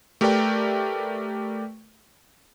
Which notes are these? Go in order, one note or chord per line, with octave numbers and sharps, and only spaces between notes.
A3 G4 A#4 B4 D5 G5